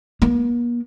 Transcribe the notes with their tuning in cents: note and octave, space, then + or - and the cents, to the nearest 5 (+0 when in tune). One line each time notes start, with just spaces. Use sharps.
A#3 +45